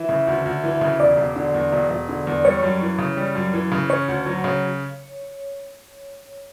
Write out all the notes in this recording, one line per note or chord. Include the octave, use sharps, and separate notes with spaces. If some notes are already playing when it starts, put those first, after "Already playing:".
Already playing: E3 E5
C#3
D2
D2
E3
C#3
E1 D5
E1
D3
E2
E1
E1
D3
E2
G3 C#5
F#2
E3
C#3
G3
F#2
E3
C#3
C#4 C#5
D2
F#3
C#3